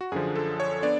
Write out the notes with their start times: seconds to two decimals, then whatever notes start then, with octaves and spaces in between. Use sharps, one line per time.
0.01 F#4
0.12 F#2 D3 F3 G#4
0.35 A4
0.60 C#5
0.82 B3 D4 D5